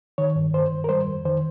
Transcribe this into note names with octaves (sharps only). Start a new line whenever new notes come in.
D#3 C#5
G2
G2 C5
D#3
A#4
G3 C5
F2
D#3 C5